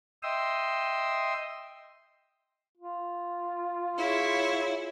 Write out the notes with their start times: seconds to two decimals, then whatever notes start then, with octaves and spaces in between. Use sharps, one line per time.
0.23 D#5 E5 G5 C6 D#6 E6
2.77 F4
3.97 E4 G#4 C#5